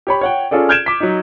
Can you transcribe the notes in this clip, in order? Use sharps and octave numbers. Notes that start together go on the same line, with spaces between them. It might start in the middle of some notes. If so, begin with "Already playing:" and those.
G4 C#5 B5
C#5 F#5 G5
C#4 F4 G#4 A4 D5
F6 G6 G#6 D7 E7
D6 B6
F#3 D#4